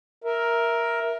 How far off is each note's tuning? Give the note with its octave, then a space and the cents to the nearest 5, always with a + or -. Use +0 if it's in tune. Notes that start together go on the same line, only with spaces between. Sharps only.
A#4 +10 E5 +0